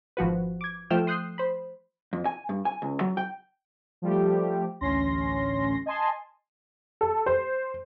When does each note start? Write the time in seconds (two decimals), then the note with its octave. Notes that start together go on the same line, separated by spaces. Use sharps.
0.17 G#1 F3 F#4 B4
0.61 D6 G#6
0.90 F3 A3 G5 F6 G6 E7
1.07 C6 D#6 F#6 G6 C7
1.38 C5 B5
2.13 F2
2.25 G#5
2.49 G2
2.65 G#5
2.82 C#2
3.00 F#3
3.17 G5
4.02 F3 G3 A3 G4
4.81 A1 D2 C#4 C6 A#6
5.86 D#5 G#5 A5 C6
7.01 A4
7.26 C5